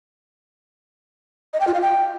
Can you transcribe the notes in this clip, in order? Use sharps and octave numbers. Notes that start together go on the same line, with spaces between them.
D#5
G5
F4
F5
G5